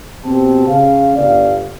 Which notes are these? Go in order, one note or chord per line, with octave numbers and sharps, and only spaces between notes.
B2 C4 G4 A5
C#3 F5
G1 D5 F5